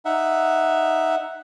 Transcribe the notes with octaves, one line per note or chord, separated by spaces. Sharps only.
D#4 E5 F#5